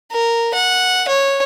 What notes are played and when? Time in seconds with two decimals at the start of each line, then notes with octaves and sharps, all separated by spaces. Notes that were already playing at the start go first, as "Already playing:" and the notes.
0.12 A#4
0.54 F#5
1.08 C#5